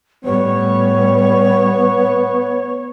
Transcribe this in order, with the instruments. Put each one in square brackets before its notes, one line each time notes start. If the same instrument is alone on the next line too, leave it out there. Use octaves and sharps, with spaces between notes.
[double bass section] A2 G3 [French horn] B3 [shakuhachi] C#5